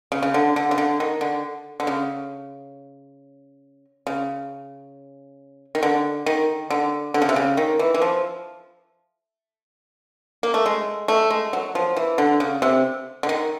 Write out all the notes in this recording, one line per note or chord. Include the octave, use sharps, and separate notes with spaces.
C#3
C#3
D3
D3
C#3
D3
D#3
D3
D3
C#3
C#3
D#3
D3
D#3
D3
D3
C#3
C3
C#3
D#3
E3
E3
F3
A#3
A3
G#3
A3
G#3
F#3
F3
E3
D3
C#3
C3
D3
D#3